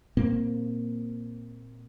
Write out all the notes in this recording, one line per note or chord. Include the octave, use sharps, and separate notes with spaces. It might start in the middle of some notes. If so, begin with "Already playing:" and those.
A#2 A#3 C4